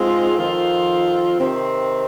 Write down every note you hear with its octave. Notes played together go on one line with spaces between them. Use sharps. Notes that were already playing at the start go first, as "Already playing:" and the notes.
Already playing: G#2 G#3 C4 F4
F2 D#3 C4 F4
C3 D#3 C4